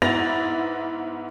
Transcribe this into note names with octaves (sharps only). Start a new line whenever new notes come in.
G#2 B3 E4 A6 A#6 F7